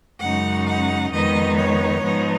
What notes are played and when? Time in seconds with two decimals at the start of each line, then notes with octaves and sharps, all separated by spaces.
0.21 F#2 C#3 G#3 D#4 F#5
0.67 F#5
1.13 F2 D#3 G#3 B3 D#4 D#5
1.58 C#5
2.03 G#2 F3 B3 D#4